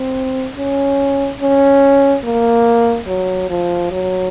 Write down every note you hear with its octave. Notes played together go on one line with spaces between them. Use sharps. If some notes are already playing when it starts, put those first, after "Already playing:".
Already playing: C4
C#4
C#4
A#3
F#3
F3
F#3